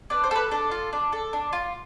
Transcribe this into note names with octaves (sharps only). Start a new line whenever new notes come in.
D4 B4
C5
A4 B4
D4 A4
F4
D4
A4
D4
F4